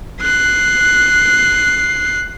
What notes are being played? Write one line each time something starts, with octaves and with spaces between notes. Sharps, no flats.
F#6 C7